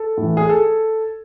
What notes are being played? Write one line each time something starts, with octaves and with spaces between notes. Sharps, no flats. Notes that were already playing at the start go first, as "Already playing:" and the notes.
Already playing: A4
A2 E3
G#4
A4